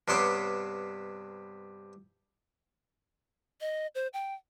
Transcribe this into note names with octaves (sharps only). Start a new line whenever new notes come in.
G2 C3 B3 C5 C#5 D6
D#5
C5
G5